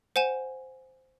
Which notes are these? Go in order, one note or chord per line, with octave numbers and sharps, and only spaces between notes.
C5 F#5 G#5 E7